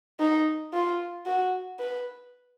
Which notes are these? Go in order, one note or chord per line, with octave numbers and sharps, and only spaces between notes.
D#4
F4
F#4
B4